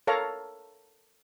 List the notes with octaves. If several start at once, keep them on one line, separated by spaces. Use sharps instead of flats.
A4 A#4 C#5 F5 A#5